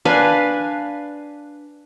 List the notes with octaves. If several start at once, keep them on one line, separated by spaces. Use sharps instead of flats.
D4 B4 F5 G#5